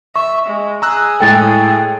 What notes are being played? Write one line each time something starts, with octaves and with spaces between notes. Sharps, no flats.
E5 C#6
G#3
G#4 A#5 E6 F#6
A2 G#3 A4 G5 A6